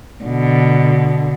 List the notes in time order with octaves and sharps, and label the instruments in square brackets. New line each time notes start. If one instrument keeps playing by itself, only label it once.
[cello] B2 D3